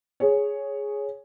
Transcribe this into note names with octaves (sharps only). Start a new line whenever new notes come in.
G#4 C#5